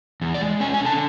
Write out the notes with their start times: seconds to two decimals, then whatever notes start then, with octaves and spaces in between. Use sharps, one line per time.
0.21 E2
0.34 D5
0.41 G#3
0.60 C#4 G#5
0.74 G#5
0.80 D3
0.86 A5